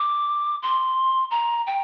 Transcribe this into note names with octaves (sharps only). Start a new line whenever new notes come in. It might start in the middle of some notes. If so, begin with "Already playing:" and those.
Already playing: D6
C6
A#5
G5